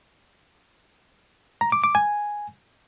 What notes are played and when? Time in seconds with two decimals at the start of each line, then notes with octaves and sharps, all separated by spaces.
1.61 A#5
1.72 D6
1.84 D6
1.95 G#5